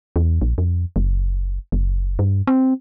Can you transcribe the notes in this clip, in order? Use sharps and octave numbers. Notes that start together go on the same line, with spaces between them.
E2
A#1
F2
F#1
F#1
G2
C4